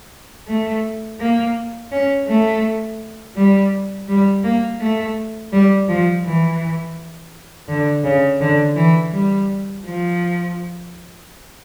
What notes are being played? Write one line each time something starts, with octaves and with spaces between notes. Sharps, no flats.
A3
A#3
C#4
A3
G3
G3
A#3
A3
G3
F3
E3
D3
C#3
D3
E3
G3
F3